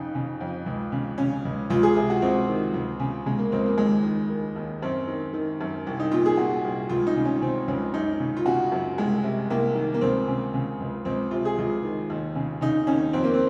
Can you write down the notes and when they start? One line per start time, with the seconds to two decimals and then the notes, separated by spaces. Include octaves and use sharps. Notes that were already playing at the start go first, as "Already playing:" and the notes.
Already playing: F2 C#3 D#4
0.15 C#3
0.41 F2
0.66 C#2
0.92 C#3
1.18 C#3 C#4
1.45 C#2
1.70 C#2 F4
1.83 G#4
1.96 C3 G#4
2.10 F#4
2.22 C#2 C4
2.49 D#3
2.74 C#2
3.00 C#3
3.26 C#3 G#3
3.39 A#3
3.52 C#2 C4
3.66 A#3
3.78 D#2 G#3
4.04 D#3
4.30 D#3
4.56 D#2
4.82 F#2 C4
5.07 D#3
5.33 D#3
5.61 F#2
5.87 C2
6.00 D#4
6.12 A#2 F4
6.26 G#4
6.37 A#2 F#4
6.64 C2
6.89 C#2 F4
7.07 D#4
7.16 C#3
7.25 C#4
7.42 C#3 C4
7.68 C#2 C#4
7.94 F#2 D#4
8.20 C#3
8.37 F4
8.46 C#3 F#4
8.72 F#2
8.98 C2 G#3
9.24 C3
9.50 C2 A#3
9.75 D#3
9.94 A#3
10.01 C#2 C4
10.28 C#3
10.54 C#3
10.80 C#2
11.05 C#2 C4
11.31 C3 F4
11.45 G#4
11.58 C#2 F4
11.83 D#3
12.10 D#2
12.35 C#3
12.61 C#3 D#4
12.87 D#2 C#4
13.13 F2 C4
13.24 A#3
13.34 C4